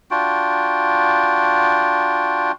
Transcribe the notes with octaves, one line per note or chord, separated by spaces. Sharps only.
D4 F4 F#4 G5